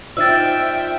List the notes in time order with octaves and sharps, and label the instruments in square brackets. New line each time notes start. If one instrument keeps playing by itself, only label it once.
[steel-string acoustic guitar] D#4 C5 D5 [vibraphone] F4 [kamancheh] E5 G5 [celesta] E6 A6